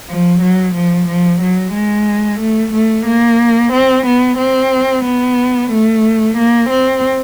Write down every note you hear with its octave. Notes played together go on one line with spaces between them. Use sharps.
F3
F#3
F3
F3
F#3
G#3
A3
A3
A#3
C4
B3
C4
B3
A3
A#3
C4